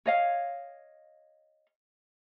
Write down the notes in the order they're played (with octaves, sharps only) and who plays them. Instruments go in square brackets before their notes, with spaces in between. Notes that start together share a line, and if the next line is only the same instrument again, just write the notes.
[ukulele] C#5 D#5 F5